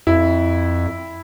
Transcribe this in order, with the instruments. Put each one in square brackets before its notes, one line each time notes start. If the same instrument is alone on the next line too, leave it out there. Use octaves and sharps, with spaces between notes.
[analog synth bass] F2 [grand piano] E4